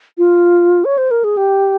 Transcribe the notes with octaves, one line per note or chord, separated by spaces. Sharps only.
F4
C#5
C5
A#4
G#4
G4